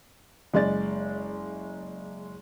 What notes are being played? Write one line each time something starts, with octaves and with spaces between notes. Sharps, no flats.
F#1 G#3 D5 A6